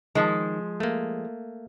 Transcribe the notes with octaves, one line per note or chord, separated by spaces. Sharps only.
D#3 F3 G#3
A3 A#3